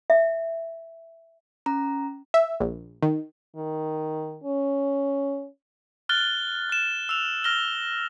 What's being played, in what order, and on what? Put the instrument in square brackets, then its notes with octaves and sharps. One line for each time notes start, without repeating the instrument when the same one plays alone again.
[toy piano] E5
[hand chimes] C#4 A#5
[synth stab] E5
A#1
D#3
[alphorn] D#3
C#4
[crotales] F6 F#6 A6 G7
F#6 E7
E6 F7
F6 A#6 G7